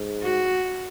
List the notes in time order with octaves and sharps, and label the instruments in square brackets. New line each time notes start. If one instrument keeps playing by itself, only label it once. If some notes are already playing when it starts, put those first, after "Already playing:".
Already playing: [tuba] G#2
[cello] F#4